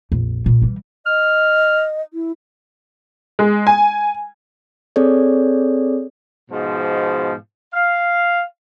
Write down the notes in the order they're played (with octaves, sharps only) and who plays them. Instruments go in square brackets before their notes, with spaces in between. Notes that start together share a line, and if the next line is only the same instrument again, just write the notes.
[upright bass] A#1 F2
A#2
E3 G3
[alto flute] D#5 [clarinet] F6
[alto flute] E4
[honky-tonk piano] G#3
G#5
[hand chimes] C4 G#4 A4 C#5 D5
[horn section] G#2 B2 F3
F5